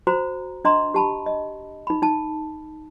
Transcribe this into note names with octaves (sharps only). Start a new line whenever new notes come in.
F#4 C5 A#5
D4 D#5 A#5 C6
G4 A5 B5
D#5
D#4 B5
D#4 A5